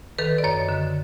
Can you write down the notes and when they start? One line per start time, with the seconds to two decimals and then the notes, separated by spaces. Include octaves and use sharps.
0.18 D#3 A4 B4
0.38 D5
0.44 F#2 C#5 D#5
0.69 D3